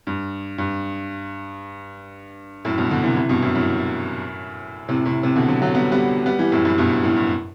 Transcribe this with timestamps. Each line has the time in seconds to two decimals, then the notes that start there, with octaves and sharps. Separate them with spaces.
0.07 G2
0.58 G2
2.65 F#2 A2
2.78 G2 B2
2.91 B2 D3
3.04 C3 E3
3.16 C3 E3
3.29 G2 B2
3.42 F#2 A2
3.55 F#2 A2
4.88 A2 C3
5.05 A2 C3
5.23 A2 C3
5.36 B2 D3
5.48 D3 F#3
5.62 D3 F#3
5.74 G3 B3
5.92 G3 B3
6.26 G3 B3
6.39 E3 G3
6.52 F#2 A2
6.65 F#2 A2
6.78 G2 B2
7.03 F#2 A2
7.16 G2